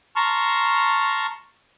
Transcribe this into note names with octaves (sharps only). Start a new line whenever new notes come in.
A5 A#5 C6 C#6 F6